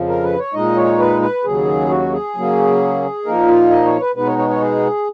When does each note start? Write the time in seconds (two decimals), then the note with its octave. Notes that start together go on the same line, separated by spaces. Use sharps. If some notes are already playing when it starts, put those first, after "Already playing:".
Already playing: F2 C#3 F3
0.09 A#4
0.23 B4
0.39 C#5
0.54 A#2 G#3 D#4 D#5
0.77 C#5
0.99 B4
1.22 B4
1.44 D#2 C#3 F#3 G#4
1.89 F#4
2.12 G#4
2.35 C#3 F#3 A#3 C#4
3.25 A#2 F3 A#3 D#4 A#4
3.48 F4
3.70 D#5
3.86 C#5
4.00 B4
4.16 B2 G#3 B3 D#4 B4
4.27 C#5
4.38 C#5
4.50 C#5
4.61 G#4